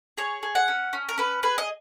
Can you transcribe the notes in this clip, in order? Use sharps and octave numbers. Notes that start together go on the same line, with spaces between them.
G#4 C#5
G#4
F#5
C#4
C#4
A#4
C#4 B4
G#4 B4
D#5